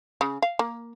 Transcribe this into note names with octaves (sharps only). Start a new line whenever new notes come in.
C#3
F5
A#3